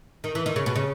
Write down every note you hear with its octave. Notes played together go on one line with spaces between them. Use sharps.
D#3
E3
D#3
C#3
B2
C#3